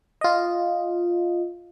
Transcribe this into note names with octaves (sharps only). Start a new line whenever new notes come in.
F4 D#5